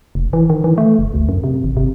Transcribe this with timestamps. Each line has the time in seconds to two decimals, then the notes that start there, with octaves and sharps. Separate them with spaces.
0.15 F1
0.33 E3
0.50 D#3
0.64 E3
0.78 A3
0.99 F#1
1.14 D2
1.29 F#2
1.44 C3
1.64 G#1
1.77 C3